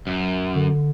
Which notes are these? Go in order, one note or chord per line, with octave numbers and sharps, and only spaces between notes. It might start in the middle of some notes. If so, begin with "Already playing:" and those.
F#2
D3